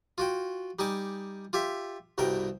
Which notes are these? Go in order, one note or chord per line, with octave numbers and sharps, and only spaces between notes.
F4 F#4 G5
G3 D#4 G#5 D6
F4 G4 E5
C2 G2 B2 A#4 G5